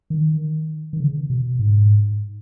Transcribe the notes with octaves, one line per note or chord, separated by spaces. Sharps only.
D#3
D#3
C#3
B2
G#2